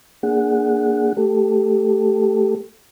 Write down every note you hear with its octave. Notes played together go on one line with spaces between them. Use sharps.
A#3 D4 G#4 F#5
A3 G4 A4